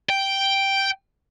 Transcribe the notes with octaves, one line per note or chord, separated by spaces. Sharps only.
G5